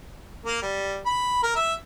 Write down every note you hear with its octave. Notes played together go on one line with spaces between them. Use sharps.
A#3
G3
B5
A#4
E5